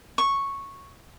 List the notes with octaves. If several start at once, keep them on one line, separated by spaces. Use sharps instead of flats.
C#6